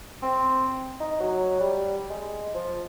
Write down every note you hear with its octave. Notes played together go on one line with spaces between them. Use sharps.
C4
D#4
F#3
G3
G#3
F3